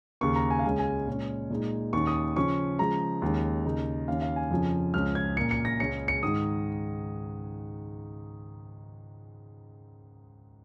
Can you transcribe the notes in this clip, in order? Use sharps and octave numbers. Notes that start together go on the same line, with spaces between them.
D#2 C#3 A#3 C#6
A#5
G#5
F5
C#2 C#3 G#3 C#4 G#5
G#5
A#2 G#3 C#4
A#2 G#3 D#4
D#2 D#3 C#4 C#6
D#6
C#3 F3 C#4 C#6
C#3 F3 G#3 A#5
D#2 D#3 G#3 C#4
D#2 C#3 A#3 D#4
D#2 D#3 C#4 F5
F5
G#5
F2 C#3 F3 C#4
C#2 C#3 F3 C#4 F6
G#6
A#2 A#3 C#4 C#7
C#7
A#6
C#2 C#3 G#3 C#4 C#7
C#7
G#2 D#3 G#3 D#6